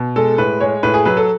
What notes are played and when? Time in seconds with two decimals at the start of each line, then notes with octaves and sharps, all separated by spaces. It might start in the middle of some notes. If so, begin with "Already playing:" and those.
Already playing: B2
0.16 G#3 A4
0.38 A2 B4
0.60 G#3 C#5
0.83 A2 B4
0.94 G#4
1.05 F#3 B4
1.17 A4